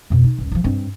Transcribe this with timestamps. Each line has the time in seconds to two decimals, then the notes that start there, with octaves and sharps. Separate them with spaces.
0.10 F2 B2
0.24 D#4
0.38 D#1 C#2
0.51 D3 F3
0.64 G2 C4